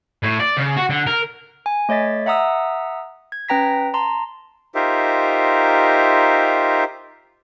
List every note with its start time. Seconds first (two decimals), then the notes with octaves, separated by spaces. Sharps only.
0.23 A2
0.40 D5
0.57 C#3
0.77 F#4
0.90 D3
1.07 A#4
1.66 G#5
1.89 A3 C#5 D#5 A6 B6
2.26 E5 F#5 A#5 D#6 E6
3.32 G#6
3.49 C#4 B4 G5 A#5 A#6 B6
3.94 A5 A#5 C6
4.75 D#4 F4 G4 A#4 C5 E5